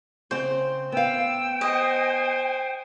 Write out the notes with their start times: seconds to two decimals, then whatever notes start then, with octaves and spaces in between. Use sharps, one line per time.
0.31 C#3 C4 C5
0.92 B3 F5 G5 E6
1.61 C5 D#5 G#5